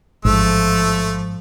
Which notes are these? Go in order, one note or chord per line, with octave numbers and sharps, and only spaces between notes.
A1 G#2 F3 A3 E6